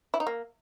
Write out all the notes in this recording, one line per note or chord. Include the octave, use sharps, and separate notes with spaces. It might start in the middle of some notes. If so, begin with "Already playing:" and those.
E4
D#4
A#3